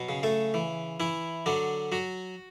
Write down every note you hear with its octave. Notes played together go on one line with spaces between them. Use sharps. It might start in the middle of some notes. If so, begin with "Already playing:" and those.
Already playing: B2 F#3
C#3
A3 A4
E3
E3 E4
D3 F#3 D4
F#3 F#4